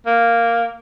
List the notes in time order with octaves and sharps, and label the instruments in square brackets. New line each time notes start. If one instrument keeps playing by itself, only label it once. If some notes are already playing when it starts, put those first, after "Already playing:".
[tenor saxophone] A#3